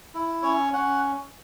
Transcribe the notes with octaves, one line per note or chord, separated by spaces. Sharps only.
E4
C#4 C#5
C#4 F#5